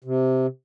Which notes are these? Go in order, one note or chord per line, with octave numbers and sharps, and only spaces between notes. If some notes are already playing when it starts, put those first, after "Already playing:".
C3